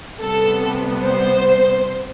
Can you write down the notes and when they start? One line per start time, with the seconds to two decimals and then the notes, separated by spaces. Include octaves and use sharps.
0.21 C3 G3 B3 A4
1.03 C5